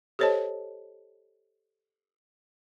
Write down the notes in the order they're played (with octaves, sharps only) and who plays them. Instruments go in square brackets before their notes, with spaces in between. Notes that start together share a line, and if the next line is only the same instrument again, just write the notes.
[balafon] G4 A4 C5 C#5 D#5 A5